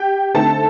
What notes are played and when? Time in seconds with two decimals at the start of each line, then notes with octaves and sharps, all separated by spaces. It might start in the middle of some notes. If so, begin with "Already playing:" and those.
Already playing: G4 G5
0.34 D3 A3 C4 D#4 A4 A5